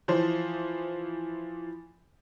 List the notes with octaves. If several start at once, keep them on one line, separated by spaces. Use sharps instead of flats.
E3 F3 C5